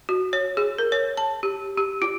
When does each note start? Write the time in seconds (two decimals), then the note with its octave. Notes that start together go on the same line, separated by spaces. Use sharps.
0.09 F#4
0.33 C#5
0.57 G#4
0.78 A#4
0.92 C#5
1.17 A5
1.43 G4
1.78 G4
2.02 F4